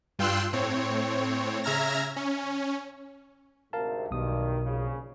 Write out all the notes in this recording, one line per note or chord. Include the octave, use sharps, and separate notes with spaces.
G2 F4 G5 C6 E6 F#6
A2 C4 C#5
C#3 E5 A#5 F6 G#6 A#6
C#4
D2 G#2 C3 A#4 F5 A5
B1 G2 B2 D#3 D#6
A#1 C#3